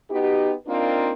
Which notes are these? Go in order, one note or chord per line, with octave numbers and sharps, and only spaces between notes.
B3 D#4 F#4 G4
A#3 C4 D4 D#4 F4 A#4